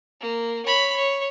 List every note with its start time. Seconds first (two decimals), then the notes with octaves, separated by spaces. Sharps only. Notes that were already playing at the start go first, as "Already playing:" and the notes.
0.21 A#3
0.65 C#5 B5
0.96 C#5